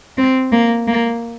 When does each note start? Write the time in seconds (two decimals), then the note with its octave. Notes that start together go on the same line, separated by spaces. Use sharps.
0.18 C4
0.52 A#3
0.88 A#3